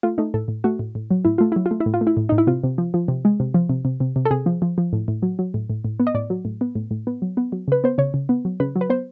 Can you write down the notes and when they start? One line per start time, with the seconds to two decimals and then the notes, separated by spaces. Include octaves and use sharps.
0.03 A3 F4
0.18 A3 D#4
0.34 A2 A4
0.48 A2
0.64 A3 F#4
0.79 A2
0.95 A2
1.11 F#3
1.25 A2 E4
1.38 A3 F4
1.52 F#3 E4
1.66 F4
1.71 A3
1.80 E4
1.86 A2
1.94 F4
2.01 A3
2.07 E4
2.17 A2
2.29 A2 D#4
2.38 E4
2.47 C3 F4
2.64 C3
2.78 F3
2.94 F3
3.08 C3
3.25 G#3
3.40 C3
3.54 F3
3.69 C3
3.85 C3
4.00 C3
4.16 C3
4.25 A4
4.31 C3 G#4
4.46 F3
4.62 F3
4.78 F3
4.93 A2
5.08 A2
5.22 F#3
5.39 F#3
5.54 A2
5.70 A2
5.85 A2
6.00 B3
6.07 D#5
6.15 A2 D5
6.30 F#3
6.45 A2
6.61 B3
6.75 A2
6.91 A2
7.07 B3
7.22 F#3
7.37 B3
7.52 F#3
7.68 C#3 B4
7.84 B3 C5
7.98 C#3 C#5
8.14 C#3
8.29 B3
8.45 F#3
8.60 C#3 B4
8.76 F#3
8.81 B4
8.90 B3 C5